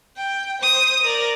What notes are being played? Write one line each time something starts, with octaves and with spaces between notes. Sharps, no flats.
G5
C5 D#6
A#4 D5